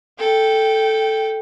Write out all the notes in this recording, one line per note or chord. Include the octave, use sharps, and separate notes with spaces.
A4 G5